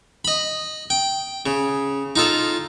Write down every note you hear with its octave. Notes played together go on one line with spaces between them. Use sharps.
D#5 B5
G5
C#3
D#4 F4 A4